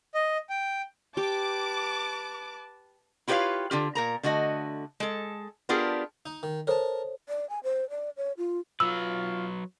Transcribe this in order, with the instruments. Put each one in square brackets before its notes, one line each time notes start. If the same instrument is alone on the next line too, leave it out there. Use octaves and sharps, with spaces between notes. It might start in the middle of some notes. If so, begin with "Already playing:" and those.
[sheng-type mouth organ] D#5
G5
[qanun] G4 [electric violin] B4 A5 [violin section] D6
[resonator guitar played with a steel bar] E4 F4 G4 B4 C#5 F5
D3 F4 G4
A#2 A#4 A#5
D3 A3 F#4 D#5
G#3 A4
B3 D4 F4 G4 G#4 A#4
[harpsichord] D#4
D#3
[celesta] A4 C5 C#5 [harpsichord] A#4 A5
[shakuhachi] D5
G#5
C5
D5
C#5
F4
[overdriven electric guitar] F#3 B4 [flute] F4 [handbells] E6